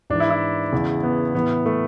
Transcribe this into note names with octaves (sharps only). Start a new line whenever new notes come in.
G#2 E3 D4
E4
E4
E2 C#3 E3
B3
A2 E3 B3
A3